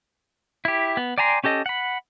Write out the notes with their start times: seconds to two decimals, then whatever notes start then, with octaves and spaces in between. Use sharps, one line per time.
0.65 E4 G4
0.97 B3
1.18 D5 G5 G#5 A#5 C6
1.44 C#4 G4 A4 D#5
1.66 F#5 B5